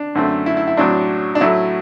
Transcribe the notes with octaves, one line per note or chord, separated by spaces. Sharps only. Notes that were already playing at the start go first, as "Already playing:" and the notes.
Already playing: D4
F#2 D3 A3 C4
E4
E4
E4
A2 F#3 C4 D4
D4
A2 F#3 A3 E4